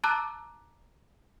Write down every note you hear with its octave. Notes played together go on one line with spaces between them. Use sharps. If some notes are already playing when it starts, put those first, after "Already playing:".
A5 A#5 D6 E6 F#6 A6